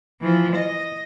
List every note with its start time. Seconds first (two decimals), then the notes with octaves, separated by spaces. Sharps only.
0.21 E3 F3
0.55 D#5